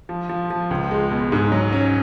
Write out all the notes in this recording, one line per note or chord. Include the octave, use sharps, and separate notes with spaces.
F3
F3
F3
C#2
G#3
B2
G#2
F#3
C#4